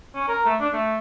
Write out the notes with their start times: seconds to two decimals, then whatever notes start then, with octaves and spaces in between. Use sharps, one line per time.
0.15 C#4
0.28 A#4
0.46 A3
0.60 D4
0.73 A3